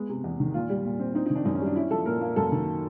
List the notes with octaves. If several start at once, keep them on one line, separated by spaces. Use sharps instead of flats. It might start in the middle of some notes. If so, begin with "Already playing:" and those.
Already playing: G#3 B3
C3
E2
D#3
A#2 F4
G3
A#2
C4
C4 D#4
D#3 D#4
D4
F#2 D#4
C#4
G3
D4
C#4 E4
F3 A4
A#2 A#4
A#3
F#2 A4
D#3